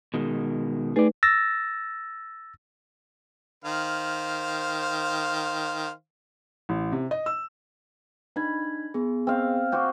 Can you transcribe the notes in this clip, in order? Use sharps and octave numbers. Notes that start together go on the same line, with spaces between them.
B2 D#3 G#3
A3 D#4 G#4 B4 D5
E6 A6 A#6
D#3 C5 F5
A1
C3
D#5
E6
D4 D#4 B5 G#6
B3 G#4
C4 F5
C4 F#4 D6 G6